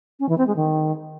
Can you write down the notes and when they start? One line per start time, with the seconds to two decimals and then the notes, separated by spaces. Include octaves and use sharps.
0.19 C#4
0.29 E3
0.38 C4
0.47 G#3
0.56 D#3